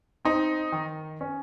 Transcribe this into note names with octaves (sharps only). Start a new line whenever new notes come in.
C4 D#4
D#3
C#4